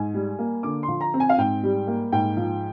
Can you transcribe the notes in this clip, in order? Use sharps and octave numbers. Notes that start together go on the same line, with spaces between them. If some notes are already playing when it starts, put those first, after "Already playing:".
Already playing: G#2 G#5
G3
A#3
D3 D6
C6
F3
A#5
C4
G#5
F5
G#2 G5
G3
A#3
G#2 G5
F3